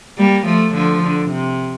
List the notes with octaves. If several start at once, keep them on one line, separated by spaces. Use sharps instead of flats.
G3 A#3
F3 A3
D3 F3
D3
C3